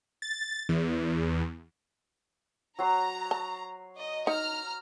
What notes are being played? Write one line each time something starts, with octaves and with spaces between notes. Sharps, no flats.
A6
E2
F#3 A#5 C6
A5
D#5
D#4 A#5 F6